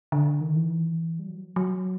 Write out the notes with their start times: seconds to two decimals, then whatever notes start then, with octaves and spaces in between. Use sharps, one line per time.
0.12 D3
0.41 D#3
0.55 E3
1.19 G3
1.28 F#3
1.56 F#3